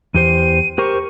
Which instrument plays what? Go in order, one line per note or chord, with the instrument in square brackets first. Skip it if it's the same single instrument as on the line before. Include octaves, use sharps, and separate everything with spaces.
[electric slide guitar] E2 G4 C5 [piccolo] D#7
[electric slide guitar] G4 A#4 C5 [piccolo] C#6